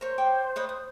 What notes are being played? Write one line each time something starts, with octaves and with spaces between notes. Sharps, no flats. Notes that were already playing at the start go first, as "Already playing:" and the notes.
A#4 C5 C#5
C#5 G5 D6
B4 C#5 D#5
D#6